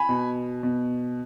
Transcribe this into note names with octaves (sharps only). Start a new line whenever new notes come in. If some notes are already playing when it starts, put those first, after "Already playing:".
Already playing: G#5 B5
B2
B2